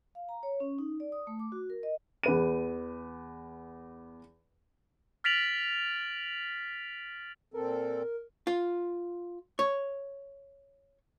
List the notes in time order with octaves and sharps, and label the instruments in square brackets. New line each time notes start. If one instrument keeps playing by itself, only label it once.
[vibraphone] F5
A#5
C#5
C#4
D#4
D5
D#6
A3
D6
F#4
A#4
D#5
[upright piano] E2 B4 D#7
[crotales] F6 A6 B6 D7 F7 F#7
[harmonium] A#2 C4 A4 [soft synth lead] A#4
[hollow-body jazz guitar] F4
C#5